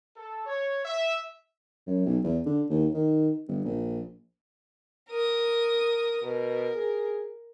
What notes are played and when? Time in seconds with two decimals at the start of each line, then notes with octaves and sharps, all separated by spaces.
0.16 A4
0.46 C#5
0.85 E5
1.87 F#2
2.06 B1
2.24 E2
2.46 D3
2.70 D#2
2.94 D#3
3.48 G1
3.65 A#1
5.09 A#4 D#6
6.22 B2 A#4
6.75 G#4